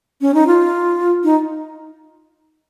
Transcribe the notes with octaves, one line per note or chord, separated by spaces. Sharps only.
C#4
D#4
F4
D#4